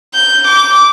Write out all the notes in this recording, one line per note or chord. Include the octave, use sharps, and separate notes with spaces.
G6
D6